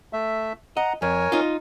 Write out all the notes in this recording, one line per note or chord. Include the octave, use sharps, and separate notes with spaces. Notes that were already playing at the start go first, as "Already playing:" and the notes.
A3 E5
D#5 F#5 A#5
F2 A#4 C#5 G#5
D#4 F4